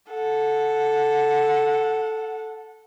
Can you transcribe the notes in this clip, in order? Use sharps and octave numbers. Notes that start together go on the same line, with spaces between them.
A4 F#5